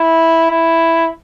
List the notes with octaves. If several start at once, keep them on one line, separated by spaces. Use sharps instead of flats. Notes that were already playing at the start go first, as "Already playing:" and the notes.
Already playing: E4
E4